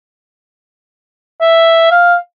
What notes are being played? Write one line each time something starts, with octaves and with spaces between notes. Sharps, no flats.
E5
F5